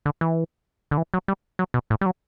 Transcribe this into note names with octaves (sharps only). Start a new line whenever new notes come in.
D3
E3
D3
E3
F#3
G3
F#3
B2
A2
G3
F#3